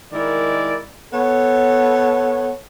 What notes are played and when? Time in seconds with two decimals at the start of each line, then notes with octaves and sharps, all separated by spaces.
0.12 D#3 G#3 E4 A#4 D5
1.13 B3 A4 C#5